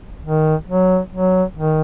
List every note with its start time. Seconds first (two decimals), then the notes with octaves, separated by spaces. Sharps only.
0.24 D#3
0.68 F#3
1.13 F#3
1.58 D#3